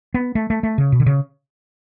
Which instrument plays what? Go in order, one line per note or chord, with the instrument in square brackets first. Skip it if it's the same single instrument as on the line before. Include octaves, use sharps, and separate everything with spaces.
[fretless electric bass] B3
A3
A3
A3
C#3
B2
D3
C#3